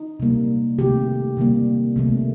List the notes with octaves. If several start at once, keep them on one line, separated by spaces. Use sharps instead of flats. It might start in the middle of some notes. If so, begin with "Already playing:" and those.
Already playing: D#4
C3 G3 A#3
C3 D#3 A3 G4
C3 D#3 G3 A#3
C3 D#3 A3